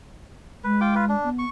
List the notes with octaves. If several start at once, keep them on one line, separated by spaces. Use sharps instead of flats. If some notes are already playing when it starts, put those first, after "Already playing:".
G#3 B4
F4 G5 D6
F4 B4
D4
B3
C#6